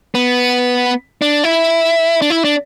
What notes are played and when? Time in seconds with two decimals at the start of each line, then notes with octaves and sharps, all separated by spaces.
0.15 B3
1.22 D4
1.44 E4
2.22 D4
2.30 E4
2.44 D4